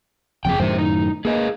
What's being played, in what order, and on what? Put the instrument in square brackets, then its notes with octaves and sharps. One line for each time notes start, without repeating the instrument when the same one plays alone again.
[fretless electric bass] F#1 F2 [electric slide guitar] G#4 G5
[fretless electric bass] F#2 A2 D#3 [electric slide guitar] G4 C5
[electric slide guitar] D#4
[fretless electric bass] A#3 [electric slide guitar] G#4 B4 D#5